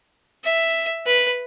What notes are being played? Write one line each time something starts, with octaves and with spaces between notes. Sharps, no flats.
E5
B4